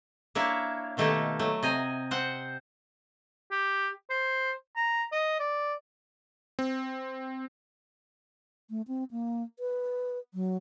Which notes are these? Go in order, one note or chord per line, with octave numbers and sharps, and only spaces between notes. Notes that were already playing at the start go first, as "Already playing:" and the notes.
A#3 D4 E4 C#5 E5
B2 D#3 A3 A#3 G4 A4
F#3 A3
C3 D#5 G#5 A#5
C4 C5 F#5
G4
C5
A#5
D#5
D5
C4
A3
C4
A#3
B4
F#3